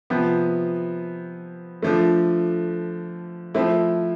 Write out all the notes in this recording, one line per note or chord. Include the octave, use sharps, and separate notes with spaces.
C3 F3 B3
D3 F3 A3
F3 A3 C4 E4